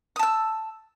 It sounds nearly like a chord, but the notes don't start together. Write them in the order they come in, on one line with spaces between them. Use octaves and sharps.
D#6 A5 E6